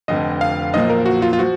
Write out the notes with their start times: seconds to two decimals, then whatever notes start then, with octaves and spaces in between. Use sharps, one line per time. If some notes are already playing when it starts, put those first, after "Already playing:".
0.08 F1 F2 D3 D#5
0.41 F5
0.73 B1 A#2 F3 A#3 D#5
0.90 A#4
1.06 F#4
1.22 F4
1.33 F4
1.39 F3 F#4